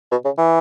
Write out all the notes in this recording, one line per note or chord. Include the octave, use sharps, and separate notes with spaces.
B2
C#3
E3